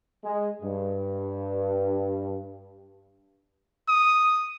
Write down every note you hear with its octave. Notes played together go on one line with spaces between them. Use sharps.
G#3
G2
D#6